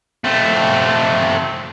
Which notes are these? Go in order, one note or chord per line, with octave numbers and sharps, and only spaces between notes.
A3 C4